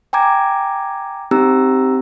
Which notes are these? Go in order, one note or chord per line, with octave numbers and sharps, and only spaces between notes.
G5 G#5 A#5 D6 G#6
C4 D#4 G4 A#5 E6